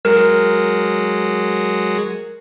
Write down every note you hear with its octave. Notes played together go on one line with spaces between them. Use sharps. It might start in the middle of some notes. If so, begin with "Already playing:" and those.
F#3 G#3 A#4